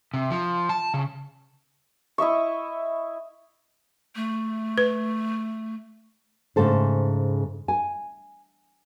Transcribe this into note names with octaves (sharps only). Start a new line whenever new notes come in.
C3
F3
A5
C#3
E4 D#5 E5 C#6
A3
B4
G#2 C#3 A3 A4 C5
G#5